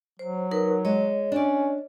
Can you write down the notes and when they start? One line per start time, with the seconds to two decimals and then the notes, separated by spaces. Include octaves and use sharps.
0.19 F#3 C5
0.51 D#4 A#4 B4
0.85 G#3 C#5 D#5
1.32 C#4 D4 D5